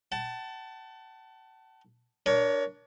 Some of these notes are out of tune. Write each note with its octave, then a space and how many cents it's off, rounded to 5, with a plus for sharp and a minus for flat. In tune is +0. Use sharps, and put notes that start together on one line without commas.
F#5 +45 A5 +5
D4 +0 A#4 +15 C#5 +25